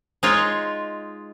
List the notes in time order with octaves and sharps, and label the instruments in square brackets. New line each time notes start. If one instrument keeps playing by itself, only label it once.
[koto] G#3 D#4 F4 C#5